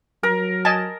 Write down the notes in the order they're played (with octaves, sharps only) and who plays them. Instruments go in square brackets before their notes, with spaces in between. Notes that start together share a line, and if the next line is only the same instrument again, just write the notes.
[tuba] F#3 [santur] A#4
[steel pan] D#5 G#5 A5